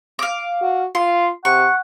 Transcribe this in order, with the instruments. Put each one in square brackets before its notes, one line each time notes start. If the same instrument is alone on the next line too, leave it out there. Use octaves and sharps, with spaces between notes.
[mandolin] F5 D6
[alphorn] F#4
[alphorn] F4 [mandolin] C6
[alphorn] C3 [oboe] F#5 [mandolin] C#6